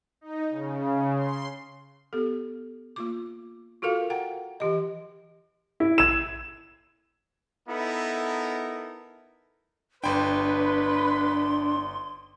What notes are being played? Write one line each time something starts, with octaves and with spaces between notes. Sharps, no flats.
D#4
C#3
C6
B3 G4 A4
A#3 F4 D6
F4 F#4 A4 A#4 F5
F#5 G5 A#5
E3 G4 D#5
E4
E6 G#6 E7
B3 D#4 E4 A4 A#4
G1 D4 B4 G5 C6